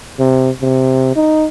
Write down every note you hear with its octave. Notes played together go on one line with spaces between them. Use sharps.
C3
C3
D#4